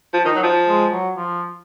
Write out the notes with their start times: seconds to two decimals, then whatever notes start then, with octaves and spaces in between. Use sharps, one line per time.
0.13 F3
0.25 D#3 D#4
0.35 F#3
0.43 F3
0.68 G#3
0.92 F#3
1.17 F3